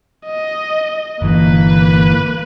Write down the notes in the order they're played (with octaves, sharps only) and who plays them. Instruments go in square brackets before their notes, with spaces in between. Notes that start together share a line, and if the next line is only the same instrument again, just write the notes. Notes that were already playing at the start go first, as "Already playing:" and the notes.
[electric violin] D#5
[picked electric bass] G1 E3 [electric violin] A#3 B4